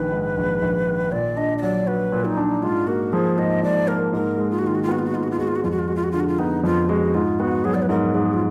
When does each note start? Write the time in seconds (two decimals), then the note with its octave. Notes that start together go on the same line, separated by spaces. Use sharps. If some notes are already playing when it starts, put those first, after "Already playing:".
Already playing: A#1 D#3 B4
0.11 G#2
0.37 A#1
0.62 A#1
0.86 D#3
1.12 A#2 D5
1.36 D4 D#5
1.58 D#5
1.62 F#3 D5
1.87 F#4 B4
2.12 A#2
2.25 D#4
2.37 D4
2.63 G#2 F4
2.87 A#3 F#4
3.13 F3 G#4
3.38 G#2 D#5
3.63 G#2 D5
3.88 A#3 A#4
4.13 G#2 A#4
4.38 G#3
4.51 F4
4.59 F#4
4.63 D#3 F4
4.75 F#4
4.83 F4
4.88 B3 F#4
4.99 F4
5.07 F#4
5.13 G#2 F4
5.23 F#4
5.31 F4
5.39 G#3 F#4
5.48 F4
5.56 F#4
5.64 F2 F4
5.71 F#4
5.79 F4
5.88 G#3 F#4
5.96 F4
6.04 F#4
6.12 D3 F4
6.20 F#4
6.28 F4
6.39 B3 D#4
6.64 F2 F4
6.89 G#3 F#4
7.14 G#2 F4
7.40 B3 F#4
7.65 F#3 G#4
7.74 D5
7.82 B4
7.89 G#2 A#4
8.14 G#2 G#4
8.34 F4